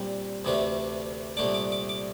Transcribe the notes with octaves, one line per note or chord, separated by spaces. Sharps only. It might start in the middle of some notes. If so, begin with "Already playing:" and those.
Already playing: A#2 G3 C4
D2 C3 E3 A3 D4
C2 A#2 A3 D4 D6
D6
D6
D6